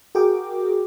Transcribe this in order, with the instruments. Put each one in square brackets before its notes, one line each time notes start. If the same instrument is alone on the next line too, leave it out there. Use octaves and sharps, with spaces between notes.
[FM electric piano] F#4 G#4 A#4 G5 D6